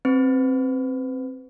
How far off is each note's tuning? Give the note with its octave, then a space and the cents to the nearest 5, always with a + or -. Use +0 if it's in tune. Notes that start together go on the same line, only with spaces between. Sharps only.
C4 +10 B4 +30